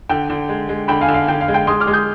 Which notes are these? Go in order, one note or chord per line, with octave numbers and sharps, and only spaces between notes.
D3 G5
D3
G#3
G#3
D3 G5 B5
F5 G#5
D3
F5
D3 G5
F5
G#3
G5
G#3 C6 D#6
D6 F6
G#3
D#6 G6